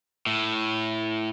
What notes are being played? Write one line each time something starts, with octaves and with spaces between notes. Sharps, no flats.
A2